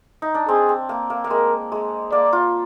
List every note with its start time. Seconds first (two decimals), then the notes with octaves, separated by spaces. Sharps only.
0.22 D#4
0.35 D4
0.49 C4 G#4
0.69 C4
0.89 A#3
1.10 A#3
1.24 A#3
1.30 G#3 A#4
1.72 G#3
2.12 A#3 D5
2.33 F4